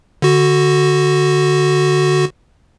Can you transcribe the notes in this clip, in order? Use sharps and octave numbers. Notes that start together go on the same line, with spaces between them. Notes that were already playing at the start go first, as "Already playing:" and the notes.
D3 F#4